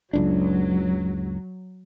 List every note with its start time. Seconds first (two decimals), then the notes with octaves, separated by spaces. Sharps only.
0.13 F#1 C#2 F#3 D4